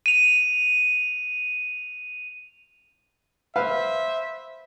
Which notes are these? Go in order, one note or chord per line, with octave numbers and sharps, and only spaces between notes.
D#7 F7
B4 C5 E5 F5